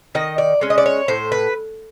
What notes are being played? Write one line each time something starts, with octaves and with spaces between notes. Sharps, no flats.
D#3 D#5
D5
G#3 C#4
D#5
D5
C#5
A2 C5
B4